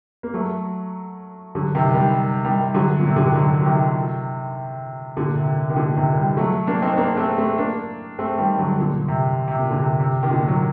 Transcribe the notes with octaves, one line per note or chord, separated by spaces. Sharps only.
A#3
F#3 A3
D3 F#3
C3 D#3
D#3 G3
D#3 G3
D3 F#3
A#2
C3
D3
D#3
D3 F#3
F#3
C3 D#3
A#2 D3
C3
C3
D#3
A#2 D3
C3 D#3
D#3 G3
F#3 A3
A#3 D4
C4 D#4
A#3 D4
A3 C4
A3 C4
A#3 D4
A3 C4
D#3 G3
D3 F#3
A#2 D3
C3
C3
A#2
D3
C3
C3
D#3
A#2 D3
F#3